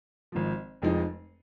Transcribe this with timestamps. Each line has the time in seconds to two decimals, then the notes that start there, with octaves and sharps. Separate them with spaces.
0.32 G#1 G#2 F3
0.82 F1 F2 F3 G#3 D#4